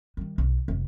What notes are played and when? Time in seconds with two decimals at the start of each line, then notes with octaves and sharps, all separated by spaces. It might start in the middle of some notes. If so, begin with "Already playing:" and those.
0.17 D#3 G3
0.38 B1
0.68 F1 D#2